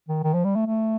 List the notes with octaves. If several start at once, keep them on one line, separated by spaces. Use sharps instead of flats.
D#3
D#3
F3
G3
A3
A3